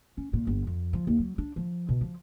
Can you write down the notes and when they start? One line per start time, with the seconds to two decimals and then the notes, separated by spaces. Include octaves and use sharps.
0.17 C#4
0.33 A#2
0.47 G1
0.67 F2
0.93 F3
1.07 D#2
1.20 F#3
1.38 D4
1.56 F3
1.89 B2
2.01 F3